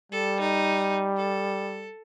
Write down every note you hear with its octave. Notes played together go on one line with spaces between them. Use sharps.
G3 A4
D#4
A4